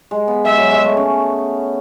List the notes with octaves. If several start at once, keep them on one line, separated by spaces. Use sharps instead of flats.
G#3
B3
G#3 E5
F#3
G#3
A3
C#4